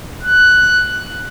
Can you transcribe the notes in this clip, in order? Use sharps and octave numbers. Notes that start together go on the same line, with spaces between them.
F#6